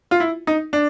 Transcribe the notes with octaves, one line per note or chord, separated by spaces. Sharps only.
F4
E4
D#4
D4